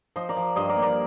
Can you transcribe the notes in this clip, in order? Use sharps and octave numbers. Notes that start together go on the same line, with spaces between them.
F3 C5 D#5
A#4 D5
F3
G2 C5 D#5
A#4 D5
A#3
A#4 D5